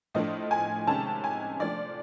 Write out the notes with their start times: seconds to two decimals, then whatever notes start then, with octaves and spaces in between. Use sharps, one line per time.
0.14 A2 F3 A3 D4 D#5
0.51 G#5
0.87 C3 D#3 G#3 C#4 A5
1.24 G#5
1.60 F3 A3 D4 D5